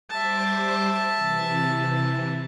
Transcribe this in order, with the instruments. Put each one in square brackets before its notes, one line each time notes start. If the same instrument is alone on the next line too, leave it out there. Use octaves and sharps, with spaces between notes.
[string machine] G3 C5 D6 [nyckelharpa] E5 A5
[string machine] C3 E3